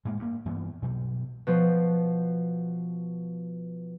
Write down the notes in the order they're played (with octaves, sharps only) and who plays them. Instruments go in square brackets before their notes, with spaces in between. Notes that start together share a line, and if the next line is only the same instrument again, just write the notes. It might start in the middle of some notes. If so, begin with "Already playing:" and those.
[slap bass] A2 G#3 A#3
G2 A#3
G2 E3 B3 C4
G2 B2 F#3
[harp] B2 F3